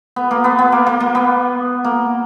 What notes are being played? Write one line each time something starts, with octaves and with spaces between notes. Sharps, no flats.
B3
A#3
B3
B3
A#3
A#3
A#3
B3
A#3